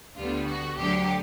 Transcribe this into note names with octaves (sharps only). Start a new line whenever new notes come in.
D2 D3 G3 B3 F4
F#4
D2 D3 F#3 G4